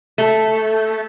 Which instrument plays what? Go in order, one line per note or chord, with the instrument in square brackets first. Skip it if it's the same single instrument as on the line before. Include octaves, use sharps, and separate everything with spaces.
[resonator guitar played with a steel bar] A3